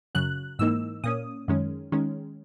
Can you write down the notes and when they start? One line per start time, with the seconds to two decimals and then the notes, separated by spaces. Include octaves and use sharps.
0.15 F#2 C#3 F#3 F#6
0.59 G#2 E3 A#3 D#4 E6
1.04 A#2 A#3 C#4 D#6
1.48 F#2 D#3 G#3 C#4
1.92 D#3 G#3 C#4